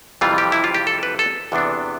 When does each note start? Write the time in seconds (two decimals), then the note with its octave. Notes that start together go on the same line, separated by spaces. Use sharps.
0.21 F2 C3 E3 G3 F4
0.38 G4
0.52 E4
0.64 F4
0.74 G4
0.87 A4
1.03 B4
1.19 A4
1.52 E2 C3 E3 B3 D4